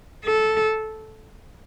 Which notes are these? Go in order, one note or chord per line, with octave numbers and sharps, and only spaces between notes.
A4